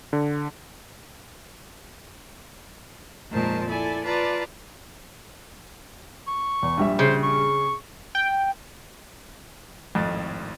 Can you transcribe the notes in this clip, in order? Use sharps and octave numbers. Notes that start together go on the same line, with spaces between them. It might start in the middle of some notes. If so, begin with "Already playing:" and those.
D3
F2 A#2 D#3 G#3 C5 A5
E4 A4 D5 G#5
F4 B4 D5 A5 A#5
C#6
E2
A#1 G3 E5
C#3 C5
C#6
G5
G#1 F2 A2 A6